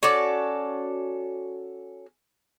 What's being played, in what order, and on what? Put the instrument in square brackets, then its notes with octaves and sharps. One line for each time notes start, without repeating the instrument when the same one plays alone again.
[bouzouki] C#4 F#4 A4 D5